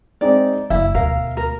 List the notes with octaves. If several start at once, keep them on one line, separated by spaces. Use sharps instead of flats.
G#3 C4 D#4 D5
F#1 E4 E5
D2 B2 A#4 F5
A#4